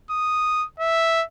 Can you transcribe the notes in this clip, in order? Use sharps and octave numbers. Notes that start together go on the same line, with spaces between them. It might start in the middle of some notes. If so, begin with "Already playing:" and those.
D#6
E5